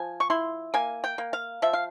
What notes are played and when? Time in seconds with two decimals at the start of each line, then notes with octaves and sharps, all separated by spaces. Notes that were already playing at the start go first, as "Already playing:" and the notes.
Already playing: F3 G#5
0.20 C#6
0.30 E4 C6
0.74 A#3 G#5
1.04 G5
1.18 A#3
1.33 F5
1.62 F3 E5
1.73 F5